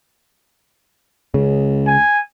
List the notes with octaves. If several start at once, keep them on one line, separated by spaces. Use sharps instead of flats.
C#2 C#3
G#5